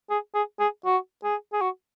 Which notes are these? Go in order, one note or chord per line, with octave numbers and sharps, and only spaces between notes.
G#4
G#4
G#4
F#4
G#4
G#4
F#4